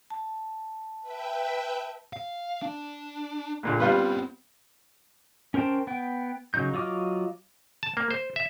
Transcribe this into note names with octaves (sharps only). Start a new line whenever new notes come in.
A5
B4 E5 G5
F5
D4
A#1 A#2 D3
G3 B3 C4 F4 B4
C#4 A#4 C5 G5 A5
B3 G5
C#3 F#3 D#4 G6
F#3 F4 D#5 D6 F6
A5
A#3
C5
E5